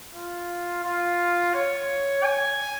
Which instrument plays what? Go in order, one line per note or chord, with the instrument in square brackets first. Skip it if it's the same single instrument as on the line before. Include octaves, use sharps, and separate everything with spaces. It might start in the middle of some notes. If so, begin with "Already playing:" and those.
[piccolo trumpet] F4
F4
C#5
G#5